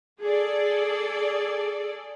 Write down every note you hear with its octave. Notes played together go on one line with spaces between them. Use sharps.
G#4 A4 D5